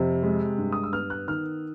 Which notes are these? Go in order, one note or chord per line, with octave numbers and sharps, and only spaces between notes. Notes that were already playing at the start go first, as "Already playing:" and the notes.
Already playing: F2 C3
G#3
G2
D#6
E6
B3 F6
F#6
D#3 F6